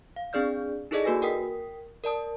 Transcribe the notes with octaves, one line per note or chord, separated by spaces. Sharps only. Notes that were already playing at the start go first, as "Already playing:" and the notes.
F5
C4 D4 G#4 D5 F6 G6
D#4 E4 G#4 A4 D5 D#5
A#3 F#4 B4 G#5 A#6
A#4 G5 D#6 B6
A#4 D5 A5 D#6